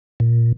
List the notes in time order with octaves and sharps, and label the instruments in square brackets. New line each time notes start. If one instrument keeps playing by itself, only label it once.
[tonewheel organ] A#2